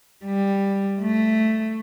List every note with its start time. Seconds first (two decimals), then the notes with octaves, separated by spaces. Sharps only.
0.25 G3
1.01 A3